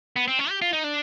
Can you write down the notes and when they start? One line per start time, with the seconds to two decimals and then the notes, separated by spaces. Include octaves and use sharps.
0.16 B3
0.28 C4
0.39 C#4
0.50 G4
0.62 F4
0.73 D#4
0.84 D4